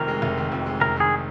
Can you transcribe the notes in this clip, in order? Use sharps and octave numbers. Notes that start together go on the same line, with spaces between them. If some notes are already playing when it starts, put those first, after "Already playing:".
Already playing: F1 F2 D#3 A#4
G#3
F1
D#3
F2
G#3
F1 A#4
D#3 G#4